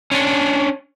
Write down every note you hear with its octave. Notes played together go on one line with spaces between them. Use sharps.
C#4 D4